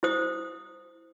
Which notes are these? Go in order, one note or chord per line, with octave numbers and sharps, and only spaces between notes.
E4 C5 D#6